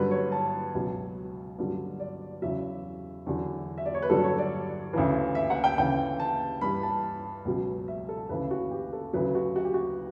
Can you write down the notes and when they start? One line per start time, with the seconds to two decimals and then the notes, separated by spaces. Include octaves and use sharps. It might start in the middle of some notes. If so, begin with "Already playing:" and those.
Already playing: G2 D3 F#3 B4
0.11 C#5
0.32 A5
0.74 C#2 B2 F#3
1.58 G2 D3 F#3
2.00 D5
2.42 E2 C#3 F#3 E5
3.26 E2 D3 F#3
3.78 E5
3.86 D5
3.94 C#5
4.02 B4
4.10 G2 D3 F#3 A4
4.24 C#5
4.38 D5
4.93 D2 C#3 E3
5.35 E5
5.50 F#5
5.64 G5
5.78 D2 C#3 E3 G5
6.20 A5
6.61 G2 E3 B5
6.83 A5
7.45 C#2 B2 F#3
7.88 E5
8.09 A4
8.29 D2 C#3 E3 B4
8.51 F#4
8.71 G4
8.93 A4
9.13 D2 C#3 F#3 B4
9.35 F#4
9.56 F#4
9.65 G4
9.74 F#4